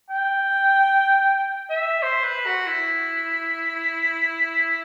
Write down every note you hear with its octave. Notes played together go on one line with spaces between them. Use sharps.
G5
E5
C5
B4
F#4
E4